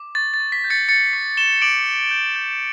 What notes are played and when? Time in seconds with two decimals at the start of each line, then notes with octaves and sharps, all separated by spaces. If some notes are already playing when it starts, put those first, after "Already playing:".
Already playing: D6
0.15 C#6 A6
0.34 A6
0.40 C#6
0.52 B6
0.64 G6
0.70 A6 C#7
0.89 G6 A6 C#7
1.13 C#6 B6
1.37 C#6 E7 G7
1.62 D6 D7 F#7
1.86 D6
2.11 G6
2.36 G6